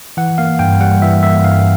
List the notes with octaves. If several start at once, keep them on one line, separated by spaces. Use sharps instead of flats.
E3 F#5
A#3 F5
G2 G5
G3 F#5
E3 E5
A#3 E5
G2 F5